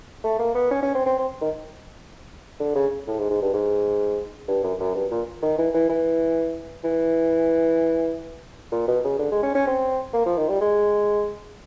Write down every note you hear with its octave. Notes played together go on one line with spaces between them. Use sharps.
A3
A#3
B3
C#4
C#4
C4
C4
C4
D#3
D3
C#3
A2
G#2
G#2
G2
G#2
G2
F#2
F#2
G2
A#2
D#3
E3
E3
E3
E3
A#2
B2
C#3
D3
G#3
C#4
C#4
C4
A#3
F3
D#3
G3
G#3